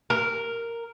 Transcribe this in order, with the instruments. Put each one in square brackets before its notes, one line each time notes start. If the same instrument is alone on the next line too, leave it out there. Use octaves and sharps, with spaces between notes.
[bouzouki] A#4